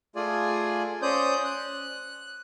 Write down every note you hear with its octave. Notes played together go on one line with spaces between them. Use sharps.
A3 F4 G#4 D5 G#5
C#4 C5 D5 D#6 G6
F#6